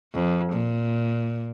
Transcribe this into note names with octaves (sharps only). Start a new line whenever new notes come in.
F2
A#2